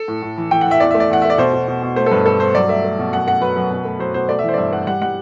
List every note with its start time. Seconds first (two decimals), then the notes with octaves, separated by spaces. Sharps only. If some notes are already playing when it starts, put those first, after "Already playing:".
Already playing: A4
0.08 A2
0.22 A2
0.38 E3
0.51 E3 G5
0.61 F#5
0.66 E3
0.71 E5
0.80 E2 D5
0.91 A3 E5
1.00 D5
1.10 E2 F#5
1.22 A3 E5
1.30 D5
1.38 B2 C5
1.53 B2
1.68 B2
1.82 B2
1.96 A3 C5
2.06 A4
2.11 G2 B4
2.26 G2 A4
2.40 G2 C5
2.55 F#3 D5
2.69 A3 E5
2.84 A3
2.98 B2
3.13 F#2 F#5
3.27 A3 F#5
3.41 F#3 B4
3.56 F#2
3.70 B2
3.85 A3
3.99 F#3 C5
4.14 B2 C5
4.29 A3 D5
4.39 E5
4.43 E3
4.48 C5
4.54 D5
4.58 G2 E5
4.72 A3 F#5
4.87 G3 F#5
5.02 G3 F#5